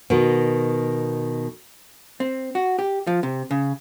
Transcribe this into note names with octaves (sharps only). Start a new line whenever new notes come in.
B2 D#3
C4
F#4
G4
F3
C3
C#3